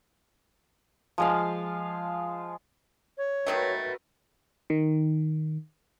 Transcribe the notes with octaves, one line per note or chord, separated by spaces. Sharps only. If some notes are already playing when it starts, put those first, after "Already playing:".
F3 G#3 F5
C#5
D#3 F#3 A3 F#4 A#4 B4
D#3